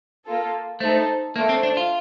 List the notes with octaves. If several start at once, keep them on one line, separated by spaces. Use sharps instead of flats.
A#3 F4 A4
A3 D#4 A4 C5
A3 A#3 D4 A4 C5
C4
D4
F4